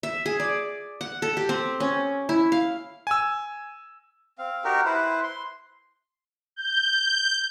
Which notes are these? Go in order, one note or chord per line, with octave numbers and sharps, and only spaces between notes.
E5
G#4
D5
F#5
A4
G4
C4
C#4
E4
F5
G#5 E6
C4 F5
D#4 F#4 G4 A#4
E4 B4 C5
C6
G6